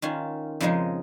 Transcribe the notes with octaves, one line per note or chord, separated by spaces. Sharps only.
D#3 C#4 F4
F2 C#3 F3 G#3 D#4